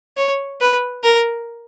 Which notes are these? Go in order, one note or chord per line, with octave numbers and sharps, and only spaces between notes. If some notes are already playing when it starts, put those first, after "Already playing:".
C#5
B4
A#4